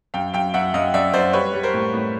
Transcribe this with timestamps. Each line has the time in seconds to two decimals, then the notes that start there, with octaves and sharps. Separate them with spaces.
0.14 F#2 F5 G5
0.34 F#2 F5 G5
0.54 F#2 E5 F#5
0.74 F#2 D#5 F5
0.94 F#2 D5 E5
1.14 F#2 C5 D5
1.33 G3 B4 C#5
1.54 G3
1.63 A#4 C5
1.74 A2
1.94 A2